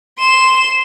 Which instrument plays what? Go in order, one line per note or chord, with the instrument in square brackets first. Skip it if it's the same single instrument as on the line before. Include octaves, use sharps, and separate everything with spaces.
[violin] C6 E7